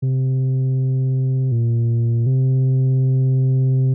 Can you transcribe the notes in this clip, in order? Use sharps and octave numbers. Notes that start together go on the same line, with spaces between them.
C3
A#2
C3